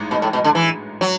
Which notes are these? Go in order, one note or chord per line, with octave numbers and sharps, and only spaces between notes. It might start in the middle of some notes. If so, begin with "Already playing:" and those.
Already playing: A1 G#2 G#3
B2
A2
B2
D3
E3
F#3